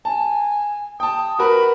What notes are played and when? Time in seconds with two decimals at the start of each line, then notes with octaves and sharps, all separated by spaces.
0.05 G#5 A5
1.00 G5 A5 D#6
1.39 F#4 A#4 B4 B5